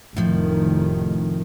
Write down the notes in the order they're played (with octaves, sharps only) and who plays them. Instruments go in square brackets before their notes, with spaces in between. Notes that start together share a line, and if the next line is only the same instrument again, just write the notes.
[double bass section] F1 D#3 [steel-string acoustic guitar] A2 F3